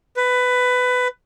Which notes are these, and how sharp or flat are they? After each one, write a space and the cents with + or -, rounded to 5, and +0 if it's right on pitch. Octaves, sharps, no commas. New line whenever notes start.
B4 +15